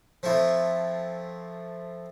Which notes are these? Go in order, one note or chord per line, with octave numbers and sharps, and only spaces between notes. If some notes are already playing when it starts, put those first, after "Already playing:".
F3 A3 C4 E4